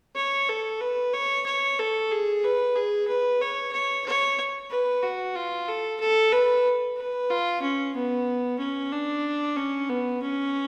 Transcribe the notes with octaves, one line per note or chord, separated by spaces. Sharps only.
C#5
A4
B4
C#5
C#5
A4
G#4
B4
G#4
B4
C#5
C#5
C#5
B4
F#4
F4
A4
A4
B4
B4
F4
C#4
B3
C#4
D4
C#4
B3
C#4